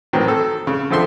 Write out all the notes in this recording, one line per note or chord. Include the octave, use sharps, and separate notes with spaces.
A2 D#3 E3 F#3 C4
A4
C#3
D3 F3 C4 A4 E5 C6